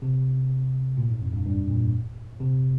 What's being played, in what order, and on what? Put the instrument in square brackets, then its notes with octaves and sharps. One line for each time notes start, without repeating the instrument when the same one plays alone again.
[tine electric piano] C3
A#2
G#2
F2
G2
G2
A#2
C3